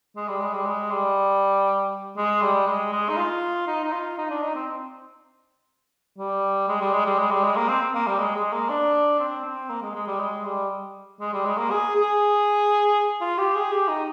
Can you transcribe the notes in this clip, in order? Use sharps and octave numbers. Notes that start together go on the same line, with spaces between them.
G#3
G3
G#3
G3
G#3
G3
G#3
G3
G#3
G#3
D#4
F4
D#4
D#4
F4
D#4
D4
D#4
C4
G3
G#3
G3
G#3
G3
G#3
G3
G#3
A#3
C4
A#3
G3
G#3
G#3
A#3
D4
C4
C4
A#3
G#3
G#3
G3
G#3
G3
G#3
G3
G#3
A#3
G#4
G#4
F4
G4
G#4
G4
D#4